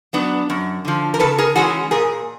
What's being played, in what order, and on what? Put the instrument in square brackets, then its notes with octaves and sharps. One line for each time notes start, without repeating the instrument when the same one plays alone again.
[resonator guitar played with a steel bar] F#3 B3 D4
F#2
D3 F3
A#4
C#3 A4 B4
G#4 A#4
E3 G#3 C#4 F#4 G#4
A#2 G#4 A#4